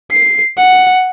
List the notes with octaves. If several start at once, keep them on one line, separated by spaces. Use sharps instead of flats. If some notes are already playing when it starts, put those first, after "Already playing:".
C7
F#5